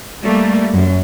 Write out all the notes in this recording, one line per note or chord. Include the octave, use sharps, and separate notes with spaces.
G3 A3 A#3
F#2